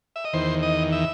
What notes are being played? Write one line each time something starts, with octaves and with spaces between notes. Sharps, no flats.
E5
D#5
E2 D#3 C5
D#5
E5